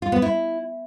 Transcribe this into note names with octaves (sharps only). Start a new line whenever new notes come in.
F4
B3
E4